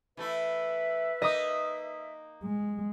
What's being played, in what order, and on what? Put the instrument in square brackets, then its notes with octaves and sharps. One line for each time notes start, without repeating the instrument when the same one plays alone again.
[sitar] E3 A3 E4 [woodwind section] B4 E5
[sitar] A#3 D#4 [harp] D#5 D#6
[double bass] G#3